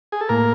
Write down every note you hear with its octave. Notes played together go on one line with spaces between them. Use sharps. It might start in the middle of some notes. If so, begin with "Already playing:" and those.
G#4
A4
A2 A#3 A#4